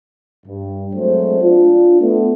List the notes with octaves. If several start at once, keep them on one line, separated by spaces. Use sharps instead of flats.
G2
F#3 G#3 A3 C4 D4 C5
D4 F4
A3 B3